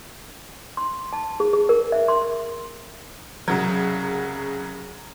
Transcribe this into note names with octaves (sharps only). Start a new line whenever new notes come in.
C6
A5
G#4
G#4
A#4
E5
C6
C2 C#3 F#3